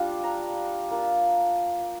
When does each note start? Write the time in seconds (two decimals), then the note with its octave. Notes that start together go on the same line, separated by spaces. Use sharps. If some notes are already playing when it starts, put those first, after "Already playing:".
Already playing: G3 D4 F4 F5
0.24 A#5
0.91 A#3 F4